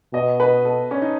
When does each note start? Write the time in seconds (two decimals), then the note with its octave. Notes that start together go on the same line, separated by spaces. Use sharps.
0.14 B2 D#5
0.40 B4
0.65 A4
0.91 C#4
1.02 D#4